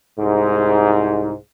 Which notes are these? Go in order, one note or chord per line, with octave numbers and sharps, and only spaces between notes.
C2 G#2